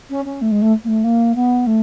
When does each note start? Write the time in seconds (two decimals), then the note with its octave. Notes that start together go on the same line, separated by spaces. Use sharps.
0.10 C#4
0.25 C#4
0.41 A3
0.51 G#3
0.61 A3
0.84 A#3
0.88 A3
1.04 A#3
1.35 B3
1.66 A3